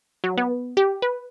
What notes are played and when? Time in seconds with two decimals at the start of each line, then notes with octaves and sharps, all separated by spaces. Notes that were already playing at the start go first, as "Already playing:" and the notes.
0.24 F#3
0.38 B3
0.77 G4
1.02 B4